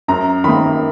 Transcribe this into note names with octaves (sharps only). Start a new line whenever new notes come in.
F#2 A#5
D#3 A#3 B5